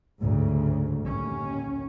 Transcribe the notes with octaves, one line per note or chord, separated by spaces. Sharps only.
D2 G#2 C#3
D#2 C#4